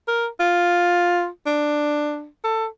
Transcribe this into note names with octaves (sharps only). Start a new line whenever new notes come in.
A#4
F4
D4
A4